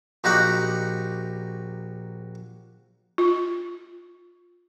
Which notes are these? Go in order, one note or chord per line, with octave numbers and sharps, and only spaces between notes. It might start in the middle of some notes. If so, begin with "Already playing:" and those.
A#1 D#4 F#4 G4 F#5
F4